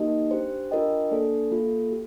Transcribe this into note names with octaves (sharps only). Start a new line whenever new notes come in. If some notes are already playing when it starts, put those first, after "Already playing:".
Already playing: A#3 D#4 G4 A#4 D#5
D4 G4 C5
D4 F4 A#4 D#5 G5
A#3 D4 A4 D5 A5
A#3 F4 A4
G4